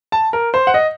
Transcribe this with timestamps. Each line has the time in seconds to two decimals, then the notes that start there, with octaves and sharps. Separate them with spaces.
0.12 A5
0.33 A#4
0.54 C5
0.67 F#5
0.74 D#5